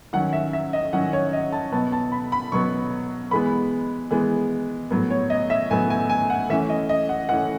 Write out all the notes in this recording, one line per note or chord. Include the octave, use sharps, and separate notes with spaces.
D#3 F#3 C#4 F#5
E5
E5
D#5
D#3 F#3 C#4 F#5
C#5
D#5
A5
B2 F#3 B3 A5
A5
B5
B5
B2 F#3 B3 C#6
E3 G#3 B3 B5
E3 G#3 B3
A2 F#3 B3
C#5
D#5
E5
A2 F#3 B3 G#5
G#5
G#5
F#5
E3 A3 C#4 E5
D#5
D#5
F#5
E3 A3 C#4 F#5